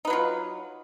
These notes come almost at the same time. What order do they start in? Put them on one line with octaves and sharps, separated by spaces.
D#4 B4 F#3 F4